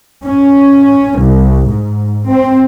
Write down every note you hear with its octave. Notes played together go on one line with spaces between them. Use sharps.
C#4
C2
G#2
C4